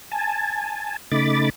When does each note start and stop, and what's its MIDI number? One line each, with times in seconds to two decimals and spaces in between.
0.11 0.97 80
0.11 0.97 81
1.12 1.50 49
1.12 1.50 57
1.12 1.50 63
1.12 1.50 83
1.12 1.50 86
1.12 1.50 93